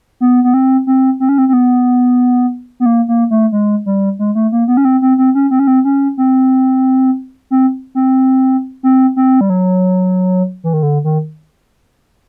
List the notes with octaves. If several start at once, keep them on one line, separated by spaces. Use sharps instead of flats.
B3
B3
C4
C4
C4
C#4
C4
C4
B3
B3
A#3
A#3
A3
G#3
G3
G#3
A3
A#3
B3
C#4
C4
C4
C4
C#4
C4
C#4
C4
C#4
C4
C4
C4
C4
C4
G3
F#3
E3
D#3
D3
D#3